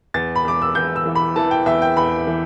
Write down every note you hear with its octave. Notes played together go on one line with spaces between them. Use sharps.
E2 A6
B5
E2 D6
E6
E2 G6
E6
E3
B5
E3 A5
G5
E2 E5
G5
E2 B5
E3